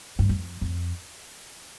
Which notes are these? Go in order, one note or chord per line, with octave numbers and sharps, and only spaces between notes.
G2
F2
F2